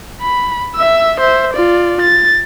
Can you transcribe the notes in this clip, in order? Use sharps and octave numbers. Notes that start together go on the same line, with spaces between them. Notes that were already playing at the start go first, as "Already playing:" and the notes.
B5
E5 E6
C5 E5
F4 D5
A6